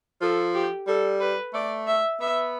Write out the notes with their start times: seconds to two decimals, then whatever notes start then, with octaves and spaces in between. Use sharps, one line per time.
0.22 F3 A4
0.55 G4
0.87 G3 A4
1.20 B4
1.54 A3 D5
1.87 E5
2.20 B3 E5